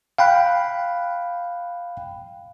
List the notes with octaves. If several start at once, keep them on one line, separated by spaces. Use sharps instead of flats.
F5 G5 B5 F#6